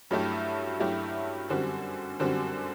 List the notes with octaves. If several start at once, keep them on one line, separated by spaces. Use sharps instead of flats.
G2 F#3 A3 E4 G4
G2 F#3 A3 E4 G4
F#2 D3 G3 C4 F#4
F#2 D3 G3 C4 F#4